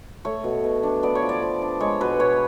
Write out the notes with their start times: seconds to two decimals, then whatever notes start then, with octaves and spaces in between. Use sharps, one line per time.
0.25 A3 C#5
0.44 B2
0.64 B2
0.83 D4
1.03 B3 D5
1.15 C#5
1.22 F3
1.29 D5
1.42 F3
1.62 D4
1.80 G#3 C#5
2.01 B2 B4
2.19 B2 C#5